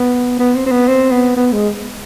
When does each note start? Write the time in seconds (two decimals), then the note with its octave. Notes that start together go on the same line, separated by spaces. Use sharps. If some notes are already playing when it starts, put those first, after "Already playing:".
Already playing: B3
0.39 B3
0.56 C4
0.66 C4
0.71 B3
0.88 C4
1.11 B3
1.37 B3
1.52 G#3